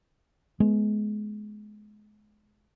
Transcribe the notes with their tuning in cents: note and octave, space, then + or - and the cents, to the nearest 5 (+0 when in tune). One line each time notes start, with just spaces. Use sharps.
G#3 +25 B3 +0